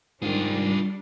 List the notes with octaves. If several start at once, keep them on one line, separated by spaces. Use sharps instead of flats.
G#2 D#3 G3 D4 F4 G#4